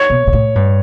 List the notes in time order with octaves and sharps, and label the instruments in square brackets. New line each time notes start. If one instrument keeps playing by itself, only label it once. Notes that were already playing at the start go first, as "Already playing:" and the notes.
Already playing: [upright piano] C#5
[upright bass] B2
B2
A2
G2